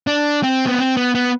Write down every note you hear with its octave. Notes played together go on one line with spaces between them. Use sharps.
D4
C4
B3
C4
B3
B3